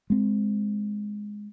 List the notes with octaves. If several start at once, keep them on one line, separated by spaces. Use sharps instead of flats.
G#3 C4